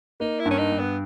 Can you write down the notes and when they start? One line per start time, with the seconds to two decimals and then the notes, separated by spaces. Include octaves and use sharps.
0.20 A#3 D#4
0.40 E4
0.46 G2
0.51 C#4
0.58 D#4
0.72 G2
0.79 B3